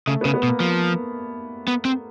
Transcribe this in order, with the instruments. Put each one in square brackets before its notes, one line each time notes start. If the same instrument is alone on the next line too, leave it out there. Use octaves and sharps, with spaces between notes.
[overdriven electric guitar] C#3 [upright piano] A3
[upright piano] B3
[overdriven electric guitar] C#3
[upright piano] B3
[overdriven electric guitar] B2
[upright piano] A#3
[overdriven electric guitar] F3 [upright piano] A#3
[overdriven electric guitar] B3
C4